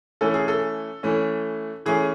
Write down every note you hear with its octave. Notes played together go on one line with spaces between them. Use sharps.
E3 A3 C#4 A4
G#4
A4
E3 A3 C#4
E3 A3 C#4 G#4